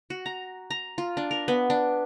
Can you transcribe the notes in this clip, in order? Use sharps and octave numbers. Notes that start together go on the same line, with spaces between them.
F#4
A#5
A#5
F4
D4
A#4
B3
D4